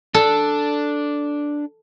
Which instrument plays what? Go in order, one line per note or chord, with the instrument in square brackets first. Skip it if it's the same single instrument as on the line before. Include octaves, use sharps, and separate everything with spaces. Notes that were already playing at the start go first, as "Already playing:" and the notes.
[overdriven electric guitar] D4 [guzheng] A4